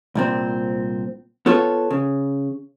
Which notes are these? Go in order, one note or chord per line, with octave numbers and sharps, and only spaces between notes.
C2 A#2 C4
B3 F4 A4 C#5
C#3